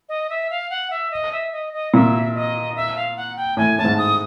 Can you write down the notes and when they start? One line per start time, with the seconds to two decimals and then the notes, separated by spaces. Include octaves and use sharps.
0.09 D#5
0.30 E5
0.50 F5
0.70 F#5
0.91 E5
1.11 D#5
1.32 E5
1.52 D#5
1.73 D#5
1.93 A#2 E5
2.34 D#5
2.76 E5
2.96 F5
3.16 F#5
3.37 G5
3.57 A2 G#5
3.78 A2 A5
3.85 G#2
3.98 D#6